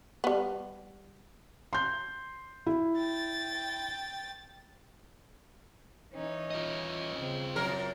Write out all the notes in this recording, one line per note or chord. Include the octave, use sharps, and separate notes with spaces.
G3 B3
C6 G6
E4
G5 A6
E3 C#4 D#4
F4 D#5
C#3 C4
F#2 A#4